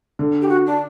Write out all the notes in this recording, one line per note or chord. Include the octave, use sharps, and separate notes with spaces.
D3
G4
F#4
D4